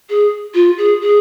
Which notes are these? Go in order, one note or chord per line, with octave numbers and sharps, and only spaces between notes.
G#4
F4
G#4
G#4